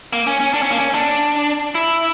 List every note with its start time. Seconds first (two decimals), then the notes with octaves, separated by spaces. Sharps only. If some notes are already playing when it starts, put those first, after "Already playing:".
0.13 A#3
0.27 C#4
0.40 C#4
0.54 D4
0.62 C#4
0.70 A#3
0.78 C#4
0.94 D4
1.75 E4